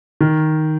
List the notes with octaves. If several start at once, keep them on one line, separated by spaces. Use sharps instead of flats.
D#3